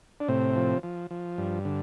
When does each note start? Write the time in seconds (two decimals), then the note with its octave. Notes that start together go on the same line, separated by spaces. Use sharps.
0.20 D4
0.28 A2 C3 C4
0.56 F3
0.83 F3
1.11 F3
1.38 G2
1.65 D3